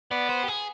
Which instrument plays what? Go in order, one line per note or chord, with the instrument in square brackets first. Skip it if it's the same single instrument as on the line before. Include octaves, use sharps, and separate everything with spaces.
[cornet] B3 [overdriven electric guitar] D5
[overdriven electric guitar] C5
G4
G#4